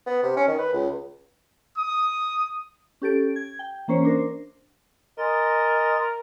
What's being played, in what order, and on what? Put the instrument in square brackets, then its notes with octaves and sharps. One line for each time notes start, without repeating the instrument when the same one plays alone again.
[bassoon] B3
C3
C#4
D#3
B4
C#2
[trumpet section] D#6
[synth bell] C#4 G4 A4 D7
G#6
G5
E3 A#3 C#4 C5 C#5
D4 A#4 C5
[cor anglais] A#4 [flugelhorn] D#5 [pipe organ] G#5 C6 A6